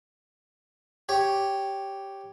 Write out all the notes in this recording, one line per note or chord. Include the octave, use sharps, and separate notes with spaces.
G4 C#5